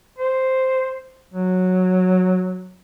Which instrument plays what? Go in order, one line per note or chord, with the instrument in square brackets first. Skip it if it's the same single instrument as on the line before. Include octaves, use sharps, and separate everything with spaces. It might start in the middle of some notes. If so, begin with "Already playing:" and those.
[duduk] C5
F#3